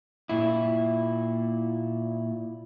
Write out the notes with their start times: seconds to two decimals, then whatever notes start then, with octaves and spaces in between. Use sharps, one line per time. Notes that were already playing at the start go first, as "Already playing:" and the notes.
0.29 A#2 E4